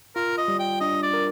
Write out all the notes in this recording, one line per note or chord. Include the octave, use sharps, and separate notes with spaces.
F4 A#4
D#5
G3
G5
D4 D#5
D5
A#4